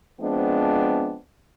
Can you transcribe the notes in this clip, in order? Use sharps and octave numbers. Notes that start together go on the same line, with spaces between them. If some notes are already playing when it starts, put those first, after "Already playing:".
F3 G#3 B3 C4 D4